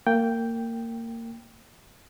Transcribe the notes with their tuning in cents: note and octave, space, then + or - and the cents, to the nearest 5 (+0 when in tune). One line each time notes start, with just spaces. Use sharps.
A#3 -25 G5 +0